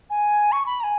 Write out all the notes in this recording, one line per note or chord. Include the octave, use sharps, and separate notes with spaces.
G#5
C#6
B5
A#5
G#5